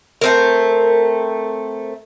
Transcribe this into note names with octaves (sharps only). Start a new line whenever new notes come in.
A3 C4 A#4